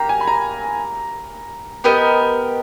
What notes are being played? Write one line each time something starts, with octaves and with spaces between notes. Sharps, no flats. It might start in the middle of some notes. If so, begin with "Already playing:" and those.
Already playing: A#3 G4 A#5
G#5
B5
A#5
B3 G4 A#4 D#5 G5